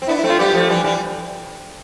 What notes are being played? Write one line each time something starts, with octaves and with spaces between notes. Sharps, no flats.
C4
B3 D4 E4
E4
A3 C4
F4
G3 B3 G4
F3 A3
E3 G3
E3 G3